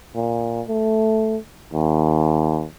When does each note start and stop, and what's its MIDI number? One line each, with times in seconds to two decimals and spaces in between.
0.15 0.62 46
0.68 1.37 57
1.74 2.66 39